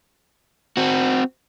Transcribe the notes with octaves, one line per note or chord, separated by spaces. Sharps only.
C4 F#4